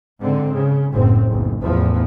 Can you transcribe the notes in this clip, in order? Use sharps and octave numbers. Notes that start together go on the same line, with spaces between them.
G#2 D3 C4
C#3
F#1 A2 C4
F#1 B1
A1 E2 A2 F3